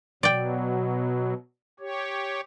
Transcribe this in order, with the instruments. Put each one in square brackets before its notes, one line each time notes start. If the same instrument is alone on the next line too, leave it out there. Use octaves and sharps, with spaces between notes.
[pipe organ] B2 F#3 [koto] D5 G5
[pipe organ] G4 C#5